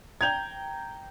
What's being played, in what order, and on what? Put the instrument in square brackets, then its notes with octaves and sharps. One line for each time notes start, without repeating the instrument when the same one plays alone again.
[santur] G5 A#5 [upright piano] G#6 F7